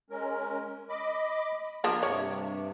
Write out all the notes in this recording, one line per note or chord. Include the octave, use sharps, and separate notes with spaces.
G#3 C#4 A#4
D#5 B5 D6
F3 A#3 D4 F6
G2 C3 C#5